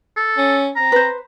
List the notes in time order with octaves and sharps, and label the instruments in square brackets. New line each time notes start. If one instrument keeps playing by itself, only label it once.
[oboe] A4
[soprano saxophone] C#4
[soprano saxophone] C4 [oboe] A#5
[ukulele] B4 C5